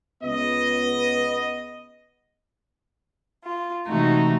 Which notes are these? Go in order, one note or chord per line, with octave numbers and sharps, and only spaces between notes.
C#2 B3 D#5
F4
C3 E3 G#3 A3 D#4 F#4